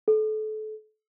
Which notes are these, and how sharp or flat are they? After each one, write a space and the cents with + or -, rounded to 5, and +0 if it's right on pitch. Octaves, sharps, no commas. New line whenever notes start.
A4 -30